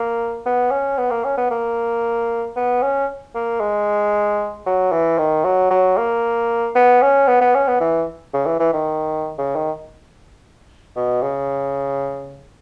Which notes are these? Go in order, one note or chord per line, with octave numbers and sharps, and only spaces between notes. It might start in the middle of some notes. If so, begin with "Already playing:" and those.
Already playing: A#3
B3
C#4
B3
A#3
C#4
B3
A#3
B3
C#4
A#3
G#3
F#3
E3
D#3
F#3
F#3
A#3
B3
C#4
B3
B3
C#4
B3
E3
C#3
E3
E3
D#3
C#3
D#3
B2
C#3